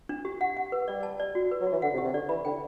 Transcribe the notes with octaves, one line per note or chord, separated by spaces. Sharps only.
D4
G4
F#5
F#5
B4
G3 D5
A5
D5
F#4
B4
F#3
F#4
E3
D3 F#5
C3
G4
C3
D3 D5
E3 B5
D3 G5